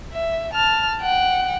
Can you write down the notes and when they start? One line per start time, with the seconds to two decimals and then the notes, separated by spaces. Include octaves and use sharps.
0.13 E5
0.53 A5 F6
1.01 F#5 G5